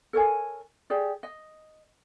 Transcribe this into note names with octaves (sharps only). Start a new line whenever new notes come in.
A4 A#4 C#5 G#5
G4 G#4 D5
D#5